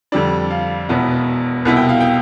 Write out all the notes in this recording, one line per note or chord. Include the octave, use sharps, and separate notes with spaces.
F2 D3 G3 D4 D5
F5
E1 E2 B2 B3 E4
C2 B2 B3 E4
G5
F5
G5